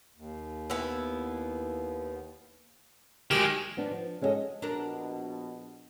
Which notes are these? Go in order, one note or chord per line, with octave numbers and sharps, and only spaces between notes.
D#2
B3 E4
D#3 G#3 G4
F3 B3 D4
F3
G#3 C#4 E4 F#4 A4 D#5
A#1 B2 D4 A#4